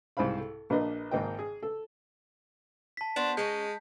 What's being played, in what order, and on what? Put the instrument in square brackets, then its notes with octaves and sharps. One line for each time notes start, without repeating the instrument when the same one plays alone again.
[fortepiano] C2 G#2 C5 F5 B5
A4
A#1 A#3 D4 B4 D#5
G#1 G#2 A#3 D#5 G5
G#4
A4
[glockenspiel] A5 B6
[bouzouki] B3 F#4 C5 [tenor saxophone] D4
[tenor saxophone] G#3 [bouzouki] C#4 D#4 B4 [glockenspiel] G6